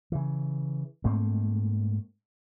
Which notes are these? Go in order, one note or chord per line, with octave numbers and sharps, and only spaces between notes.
C#3 E3
G#2 A3 A#3 C4